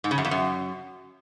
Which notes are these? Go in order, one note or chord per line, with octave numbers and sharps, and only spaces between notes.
G#2
C#3
F#2
F2
F#2